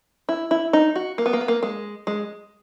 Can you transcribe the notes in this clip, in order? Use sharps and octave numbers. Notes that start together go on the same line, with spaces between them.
E4
E4
D#4
F#4
A#3
B3
A#3
B3
A#3
G#3
G#3